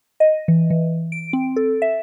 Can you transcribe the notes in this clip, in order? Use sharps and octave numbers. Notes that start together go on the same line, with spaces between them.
D#5
E3
E3
D7
C4
A4
E5